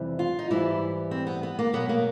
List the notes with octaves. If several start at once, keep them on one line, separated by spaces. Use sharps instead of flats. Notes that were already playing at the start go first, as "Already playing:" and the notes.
Already playing: F2 C3 E3 G3
F4
D#4
G#2 E3 G3 E4
C4
B3
B3
A#3
B2 F#3 B3
A#3